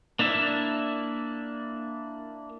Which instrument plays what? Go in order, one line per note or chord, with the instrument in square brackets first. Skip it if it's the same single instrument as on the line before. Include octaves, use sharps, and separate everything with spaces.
[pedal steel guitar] A#3 D4 E4 E5